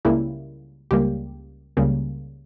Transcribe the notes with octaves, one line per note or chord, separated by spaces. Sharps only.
C#2 C#3 G3 A#3 E4
C#2 C#3 G3 A#3 G4
C#2 C#3 G3 A#3